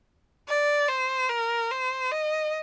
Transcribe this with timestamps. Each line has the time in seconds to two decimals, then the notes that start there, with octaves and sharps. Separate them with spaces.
0.48 D5
0.88 C5
1.30 A#4
1.71 C5
2.11 D#5